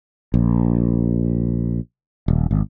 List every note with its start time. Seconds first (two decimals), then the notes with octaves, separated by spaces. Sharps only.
0.34 A#1
2.28 D#1
2.51 G#1